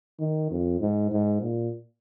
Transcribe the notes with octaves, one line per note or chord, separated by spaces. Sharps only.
D#3
F2
G#2
G#2
A#2